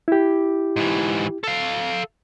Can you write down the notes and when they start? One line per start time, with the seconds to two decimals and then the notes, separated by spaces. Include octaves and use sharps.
0.08 E4 G4
0.76 G#2 E3
1.44 A4 F5